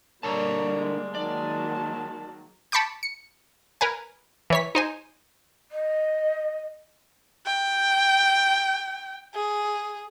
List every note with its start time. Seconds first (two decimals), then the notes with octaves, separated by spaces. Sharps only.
0.23 D3 G3 A#3 A#4 C#5 D5 A5 A#5
0.79 G#3
1.15 D#3 F#3 A#3 D5 A5
2.72 A5 B5 C#6 D6 G6
3.03 C#7
3.81 A#4 B4 G#5
4.50 E3 C#5 B6
4.75 D#4 C5 G#5
5.71 D#5
7.46 G5
9.35 G#4